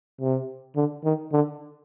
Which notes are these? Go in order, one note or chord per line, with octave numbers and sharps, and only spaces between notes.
C3
D3
D#3
D3